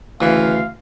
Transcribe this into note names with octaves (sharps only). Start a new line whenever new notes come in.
D2 C#3 E3 F5